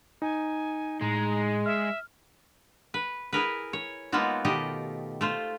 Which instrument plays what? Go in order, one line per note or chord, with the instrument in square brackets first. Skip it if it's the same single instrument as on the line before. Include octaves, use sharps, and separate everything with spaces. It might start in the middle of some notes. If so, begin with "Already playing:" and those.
[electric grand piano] D#4 [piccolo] G#5
[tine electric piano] A2 [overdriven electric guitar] G#3 [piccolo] A#5
[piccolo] E5 [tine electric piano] F6
[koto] B4
E4 G#4 A#4 B4
C#5
G#3 A#3 B3 D#4 F4 F#4
B2 D#3 A3 G4 D#5
A3 F4 C5